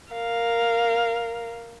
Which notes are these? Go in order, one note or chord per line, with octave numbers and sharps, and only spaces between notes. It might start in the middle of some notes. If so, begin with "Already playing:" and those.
A#4 F5